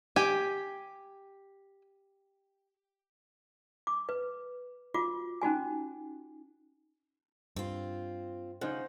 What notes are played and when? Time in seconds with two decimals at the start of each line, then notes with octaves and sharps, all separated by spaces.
0.16 G4 G5 G#5
3.87 D6
4.09 B4
4.94 F4 F#4 D6
5.42 C#4 D#4 F#4 G#5
7.56 G2 C4 F4
8.61 C#3 D#4 C5 F#5